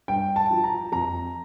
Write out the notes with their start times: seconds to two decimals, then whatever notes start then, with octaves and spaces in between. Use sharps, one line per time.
0.08 G2 G5
0.36 A5
0.50 F3
0.64 A#5
0.92 F2 A#5